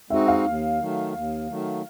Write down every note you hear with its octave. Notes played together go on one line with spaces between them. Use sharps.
G#3 C4 D#4 F#4 E5
F5
D#2
D#3 F#3 A3
D#2
D#3 F#3 A3